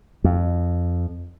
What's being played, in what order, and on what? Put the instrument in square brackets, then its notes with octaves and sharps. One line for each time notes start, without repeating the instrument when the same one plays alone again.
[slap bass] F2